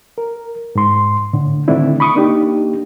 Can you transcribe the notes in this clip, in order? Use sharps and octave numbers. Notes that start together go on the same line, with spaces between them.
A#4
G#2 C6
A2 D3
D3 D#3 A3 C4 D4 E4
B5 C#6 D#6
A#3 D4 D#4 G4